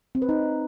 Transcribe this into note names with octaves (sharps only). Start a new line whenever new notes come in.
C4
B4
D#4